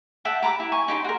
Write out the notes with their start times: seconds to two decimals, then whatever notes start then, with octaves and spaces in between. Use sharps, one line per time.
0.25 E5 F#5 G5 A5
0.43 G4 A#5 B5 D6
0.60 E4
0.72 G#5 C#6
0.88 D#4 G4 G5 C6
1.04 F#4 A#4